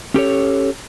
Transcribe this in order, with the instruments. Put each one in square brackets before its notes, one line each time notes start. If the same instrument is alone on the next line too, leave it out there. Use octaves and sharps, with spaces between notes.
[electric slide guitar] C#4 G4 A4 C#5